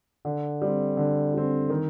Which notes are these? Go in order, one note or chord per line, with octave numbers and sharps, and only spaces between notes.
D3
G3 C4
D3
G3 C4
D#3